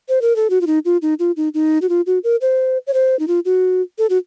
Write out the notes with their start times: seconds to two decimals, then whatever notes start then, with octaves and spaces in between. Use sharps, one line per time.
0.09 C5
0.22 A#4
0.36 A4
0.50 F#4
0.61 F4
0.67 D#4
0.85 F4
1.02 D#4
1.19 F4
1.37 D#4
1.54 D#4
1.82 F#4
1.89 F4
2.06 F#4
2.24 A#4
2.41 C5
2.87 C#5
2.94 C5
3.19 D#4
3.28 F4
3.45 F#4
3.98 A4
4.10 F#4